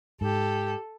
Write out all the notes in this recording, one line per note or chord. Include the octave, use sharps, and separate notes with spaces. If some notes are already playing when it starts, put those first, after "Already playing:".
G#2 G4 A4